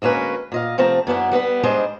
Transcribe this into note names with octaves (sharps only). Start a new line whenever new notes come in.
D2 G#3 A#3 C#4 B4
A#2 D#5 F5
C3 F3 A3 C4 A5 A#5
F#2 B3 D4 E4
G3 B3 A4 B4
G#2 G3 G#3 D4 C5 D#5